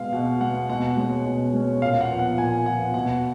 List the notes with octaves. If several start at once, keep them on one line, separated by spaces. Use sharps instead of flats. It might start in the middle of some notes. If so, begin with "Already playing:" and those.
Already playing: B2 G#3 B3 F5
B2 F#5
G#3 B3 F#5
B2 F#5
G#3 C#4
B2
G#3 C#4
A#2 F5
F#5
F3 B3
F#5
A#2 G#5
F3 B3 F#5
B2 F#5